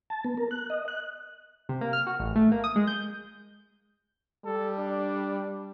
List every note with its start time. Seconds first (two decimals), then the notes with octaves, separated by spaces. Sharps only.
0.10 A5
0.24 B3
0.37 A#4
0.51 F#6
0.70 D#5
0.88 F#6
1.69 C3
1.81 A#3
1.93 F6
2.07 F#4
2.20 A1
2.36 A3
2.52 A#3
2.64 D#6
2.76 G#3
2.87 G6
4.45 G3 A4
4.78 D4